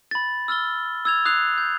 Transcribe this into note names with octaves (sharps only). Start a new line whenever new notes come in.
B5 A6
E6 F6 A6 G7
E6 G#6 F7
D#6 F#6 C7 F7
G6